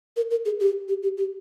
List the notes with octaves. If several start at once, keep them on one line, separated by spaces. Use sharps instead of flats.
A#4
A#4
G#4
G4
G4
G4
G4